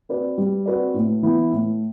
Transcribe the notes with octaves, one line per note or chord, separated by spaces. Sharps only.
C4 F#4 B4 D5
G3
C4 F#4 B4 D5
A2
E3 B3 E4
A2